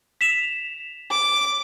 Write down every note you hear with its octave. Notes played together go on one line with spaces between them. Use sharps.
B6 E7 F7
D6